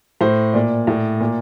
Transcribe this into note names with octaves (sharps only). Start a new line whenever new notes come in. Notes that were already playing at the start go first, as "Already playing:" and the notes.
A2 C5
A#2 D5
A2
A#2